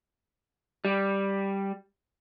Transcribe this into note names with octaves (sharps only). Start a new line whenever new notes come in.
G3